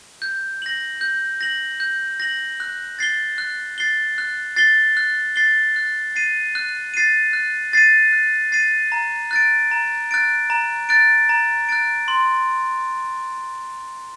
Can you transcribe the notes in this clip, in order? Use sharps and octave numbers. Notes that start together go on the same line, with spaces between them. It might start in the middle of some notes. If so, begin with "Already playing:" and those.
G6
A#6 F#7
G6
A#6 F#7
G6
A#6 F#7
F#6
A6 C7 G7
F#6
A6 C7 G7
F#6
A6 C7 G7
F#6
A6 C7 G7
F#6
A6 C7 D#7
F#6
A6 C7 D#7
F#6
A6 C7 D#7
F#6
A6 C7 D#7
A#5
F#6 A6 D7
A#5
F#6 A6 D7
A#5
F#6 A6 D7
A#5
F#6 A6 D7
C6